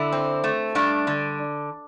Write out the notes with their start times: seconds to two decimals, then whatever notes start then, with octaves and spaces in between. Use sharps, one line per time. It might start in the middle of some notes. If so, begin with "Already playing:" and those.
Already playing: D3 E4
0.12 C4
0.44 A3
0.75 G2 D4
1.07 D3